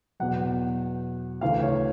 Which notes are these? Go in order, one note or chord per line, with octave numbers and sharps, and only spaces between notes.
E2 B2 F#3 F#5
D2 C#3 E3 F5
C#5